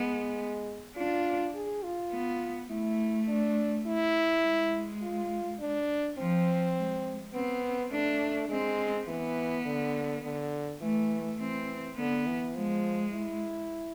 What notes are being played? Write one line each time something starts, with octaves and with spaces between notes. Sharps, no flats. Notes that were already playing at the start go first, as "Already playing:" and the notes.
Already playing: G#3 B3
D4 F4
G#4
F4
B3
A3 E4
D4
E4
G#3
F4
D4
F3 C4
G#3
B3 C4
A3 D4
G#3 C4
E3 B3
D3
D3
E3 A3
E3 C4
D3 B3
E3
F3 G#3
E4